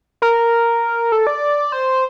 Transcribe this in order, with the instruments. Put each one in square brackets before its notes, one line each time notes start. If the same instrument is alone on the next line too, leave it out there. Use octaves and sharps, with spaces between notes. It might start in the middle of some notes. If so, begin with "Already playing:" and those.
[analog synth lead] A#4
A4
D5
C5